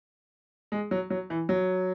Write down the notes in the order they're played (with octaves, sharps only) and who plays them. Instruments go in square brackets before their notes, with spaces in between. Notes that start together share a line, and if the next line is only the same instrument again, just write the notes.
[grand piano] G#3
F#3
F#3
E3
F#3